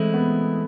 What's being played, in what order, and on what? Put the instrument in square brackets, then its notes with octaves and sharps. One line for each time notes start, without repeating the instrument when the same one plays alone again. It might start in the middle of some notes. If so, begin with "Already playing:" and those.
Already playing: [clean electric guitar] E3 G#3 C4 E4 [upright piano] A3
[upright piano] B3